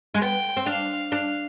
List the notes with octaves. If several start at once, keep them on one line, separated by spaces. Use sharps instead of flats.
G#3
B3 G5
C4
D4 F5
D4 F5